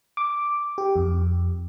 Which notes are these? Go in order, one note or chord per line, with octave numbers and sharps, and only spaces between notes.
D6
G4
F2